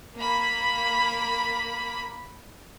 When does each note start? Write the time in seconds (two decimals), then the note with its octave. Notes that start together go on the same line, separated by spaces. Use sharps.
0.16 A#3 B5